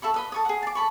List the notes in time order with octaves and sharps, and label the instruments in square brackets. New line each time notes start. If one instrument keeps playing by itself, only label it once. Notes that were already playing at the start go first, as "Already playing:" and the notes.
[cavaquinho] A4 E5 B5 C#6
B4 D#5 B5
A4 C#6 D#6
G#4 F#5
A5 D6
A4 B5 C#6